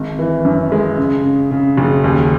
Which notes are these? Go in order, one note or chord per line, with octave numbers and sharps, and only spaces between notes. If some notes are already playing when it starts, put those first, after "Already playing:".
Already playing: G#1
E3
F#2
G#3
C#3
C#3
C#3
F#1
D#2